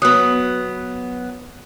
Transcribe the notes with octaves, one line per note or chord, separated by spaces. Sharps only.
F#3 B3 D#6 F#6